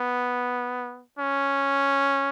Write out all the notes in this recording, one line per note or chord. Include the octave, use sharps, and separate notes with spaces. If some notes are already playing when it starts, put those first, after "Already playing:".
Already playing: B3
C#4